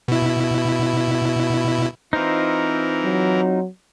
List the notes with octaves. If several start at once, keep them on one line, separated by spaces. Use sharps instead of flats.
B2 E4
E3 C4 D#4 F4 A#4 C5
F#3